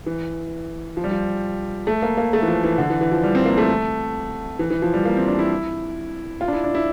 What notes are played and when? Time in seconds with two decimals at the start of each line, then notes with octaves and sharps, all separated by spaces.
0.06 E3
0.97 F3
1.04 G3
1.11 F3
1.87 A3
2.02 A#3
2.17 A#3
2.33 A3
2.42 E3
2.48 F3
2.64 E3
2.78 D3
2.90 E3
3.01 E3
3.12 F3
3.23 G3
3.35 C4
3.46 A#3
3.58 A3
4.59 E3
4.70 E3
4.82 F3
4.94 G3
5.05 A#3
5.17 C4
5.28 D4
5.39 E4
6.41 F4
6.48 D4
6.53 E4
6.64 D4
6.75 E4